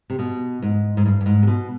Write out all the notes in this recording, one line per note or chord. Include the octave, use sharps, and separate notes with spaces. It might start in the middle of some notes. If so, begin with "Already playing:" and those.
C3
B2
G#2
G#2
G2
G2
G#2
C3
B2